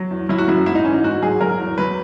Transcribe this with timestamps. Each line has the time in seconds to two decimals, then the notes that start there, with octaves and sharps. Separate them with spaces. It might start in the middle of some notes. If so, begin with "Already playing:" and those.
Already playing: F#3
0.11 E2
0.29 F#3 E4
0.38 F#4
0.48 F#2 E4
0.66 G#2 E4
0.75 D#4
0.84 E3 C#4
0.93 D#4
1.04 G#2 F#4
1.22 F#3 G#4
1.41 F#3 A#4
1.60 E2
1.78 F#3 B4